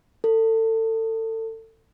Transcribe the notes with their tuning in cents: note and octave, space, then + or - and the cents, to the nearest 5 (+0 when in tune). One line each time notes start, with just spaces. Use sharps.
A4 +30